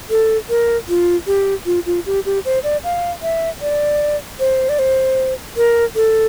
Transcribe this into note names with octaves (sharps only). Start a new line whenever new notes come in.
A4
A#4
F4
G4
F4
F4
G4
G4
C5
D5
F5
E5
D5
C5
D5
C5
A#4
A4